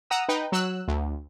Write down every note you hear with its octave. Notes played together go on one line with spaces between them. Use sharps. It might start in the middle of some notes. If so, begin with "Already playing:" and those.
F#5 A#5 D#6 E6
D#4 B4 G5
F#3 E6 F#6
D2